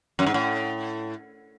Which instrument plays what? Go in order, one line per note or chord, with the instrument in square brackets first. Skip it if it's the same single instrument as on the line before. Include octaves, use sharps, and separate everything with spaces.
[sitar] F#2
G#2
A2